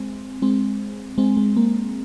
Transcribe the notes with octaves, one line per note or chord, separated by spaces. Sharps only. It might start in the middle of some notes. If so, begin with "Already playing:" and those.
Already playing: G#3 C4
G#3 C4
G#3 C4
G#3
A#3